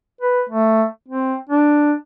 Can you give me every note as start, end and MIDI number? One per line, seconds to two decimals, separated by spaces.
0.21 0.42 71
0.49 0.85 57
1.08 1.35 60
1.49 1.93 62